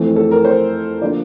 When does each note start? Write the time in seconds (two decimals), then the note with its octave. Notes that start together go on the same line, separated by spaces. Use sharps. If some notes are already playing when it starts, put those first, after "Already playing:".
Already playing: F2 E3 A3 C4
0.16 A4
0.31 A#4
0.45 C5
1.01 D3 F3 A#3 D5